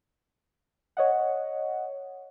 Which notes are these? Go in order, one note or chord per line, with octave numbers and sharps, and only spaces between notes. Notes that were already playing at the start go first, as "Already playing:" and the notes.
C#5 D#5 F#5